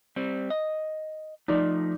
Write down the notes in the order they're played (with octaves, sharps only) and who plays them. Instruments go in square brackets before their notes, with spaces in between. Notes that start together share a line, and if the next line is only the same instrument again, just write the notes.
[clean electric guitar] G3 C4
D#5
[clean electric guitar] F3 A3 [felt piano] D#4 D5